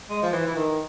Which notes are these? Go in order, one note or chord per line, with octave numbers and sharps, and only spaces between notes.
G#3
F3
E3
E3
D#3